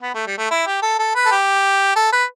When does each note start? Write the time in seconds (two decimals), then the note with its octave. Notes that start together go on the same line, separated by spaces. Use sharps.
0.02 B3
0.14 A3
0.26 G3
0.38 A3
0.51 E4
0.66 G4
0.82 A4
0.99 A4
1.15 B4
1.26 A4
1.31 G4
1.96 A4
2.12 B4